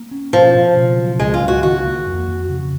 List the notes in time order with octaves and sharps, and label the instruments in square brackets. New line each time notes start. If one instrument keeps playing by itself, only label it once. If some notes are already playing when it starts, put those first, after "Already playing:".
Already playing: [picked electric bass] A#3
C#4
[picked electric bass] B2 [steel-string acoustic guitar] F3
[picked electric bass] B2
C#3
F#3
[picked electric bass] C#2 [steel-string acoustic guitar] G#3
[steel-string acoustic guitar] F4
[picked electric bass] C#2
[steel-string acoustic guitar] F#4
[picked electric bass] D#3 [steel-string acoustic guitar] F#4
[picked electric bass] A#3
F2
F2
C#3